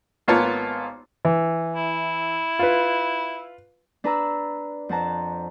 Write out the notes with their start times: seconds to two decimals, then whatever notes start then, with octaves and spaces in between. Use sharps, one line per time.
0.28 G#1 A#3 B3 F4 C#5 A5
1.25 E3
1.75 E4
2.59 F4 B4
4.04 D4 B4 A#5 E6
4.89 F2 C5 F#5 A5 A#5